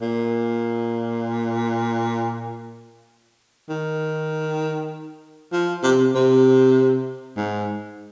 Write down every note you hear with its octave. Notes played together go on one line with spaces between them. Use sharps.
A#2
D#3
F3
C3
C3
G#2